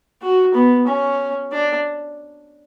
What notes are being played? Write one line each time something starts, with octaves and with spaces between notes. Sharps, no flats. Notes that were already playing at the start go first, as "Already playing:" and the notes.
F#4
B3
C#4
D4